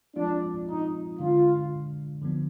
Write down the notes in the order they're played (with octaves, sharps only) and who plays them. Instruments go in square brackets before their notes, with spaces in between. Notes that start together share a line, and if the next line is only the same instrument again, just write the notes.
[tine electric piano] F3 G#3 C4 F4 [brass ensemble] D4
[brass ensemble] D#4
[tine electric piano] D3 G#3 D4 [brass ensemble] F4
[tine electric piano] D3 F3 B3 D4